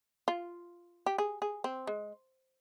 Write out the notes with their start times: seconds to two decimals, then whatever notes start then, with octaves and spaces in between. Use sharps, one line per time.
0.28 F4
1.06 G4
1.18 G#4
1.42 G#4
1.64 C4
1.87 G#3